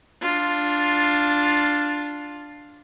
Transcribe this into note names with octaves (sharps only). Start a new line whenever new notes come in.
D4 F4